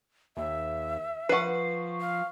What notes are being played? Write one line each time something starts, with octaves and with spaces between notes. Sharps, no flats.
D#2 E5
F3 B4 F#5 C#6 C7
F5